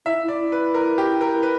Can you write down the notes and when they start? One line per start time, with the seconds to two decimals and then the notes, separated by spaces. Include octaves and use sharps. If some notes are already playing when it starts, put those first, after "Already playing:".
0.06 E4 E5
0.23 E4
0.28 D5
0.52 B4
0.74 A#4
0.98 G4
1.21 A#4
1.43 B4